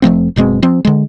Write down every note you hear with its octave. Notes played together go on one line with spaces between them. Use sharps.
F1 F3 A3 C4
F#1 B2 G#3 C4
F3 C4
D3 G#3